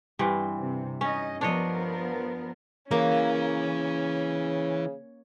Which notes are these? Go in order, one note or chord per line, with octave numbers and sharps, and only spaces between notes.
G2 E3 C4
C3
C#4 D#4 D#5
F3 B3 D4 A#4 C#5 D#5
C#3 E3 A#3 C#4